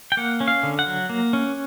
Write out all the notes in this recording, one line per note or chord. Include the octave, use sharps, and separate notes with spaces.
G5
A#3 F#5
C#4
F5
D3
F#5
F#3
A#3
C#4